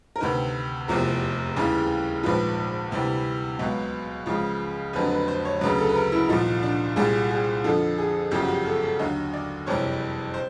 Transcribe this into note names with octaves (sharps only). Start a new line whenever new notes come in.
A#4
D2 C3 D#3 B4
F1 E2 C3 F3 A#4
D#2 C#3 E3 G3
A#1 G#2 F3 B4
D2 C3 E3 G3
C#2 B2 F#3 B4
C#2 C#3 F3
F1 F2 D3 F#3 B4
B4
C5
C#5
D2 C#3 F#3 B4
A4
B4
A#4
E4
C2 A#2 F3 D#4
D4
C2 A#2 G3 G#4
G#4
F2 D3 F3 A4
G#4
G1 F#2 C#3 F3 G4
F#4
G4
A4
A4
D#2 D3 F#3 D#5
D5
F#1 F2 C3 E3 G3 C#5
C5